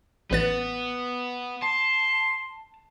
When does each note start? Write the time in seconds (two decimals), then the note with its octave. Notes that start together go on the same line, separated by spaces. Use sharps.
0.31 A1 B3 B4 A6
1.62 A5 C6